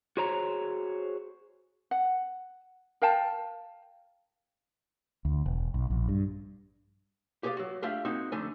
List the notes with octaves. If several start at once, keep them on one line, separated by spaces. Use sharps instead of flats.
F#4 G#4 C5 C#5 A#5
F#5
A#4 F5 G5 A5
D2
E1
B1
A#1
G2
G4 G#4 B4 C5 D5 F5
F#3 F#4
A3 D4 F4 G4 E5 F5
G#3 A#3 C4 D#4 F#4
F2 D3 A3 D#4 G#5